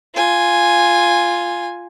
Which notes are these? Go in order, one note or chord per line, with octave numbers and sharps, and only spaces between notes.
F4 G#5